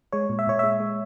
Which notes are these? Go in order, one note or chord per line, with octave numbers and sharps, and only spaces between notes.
G#3 C#5
A#2
E5
A#2 C#5
G#3 E5
G#3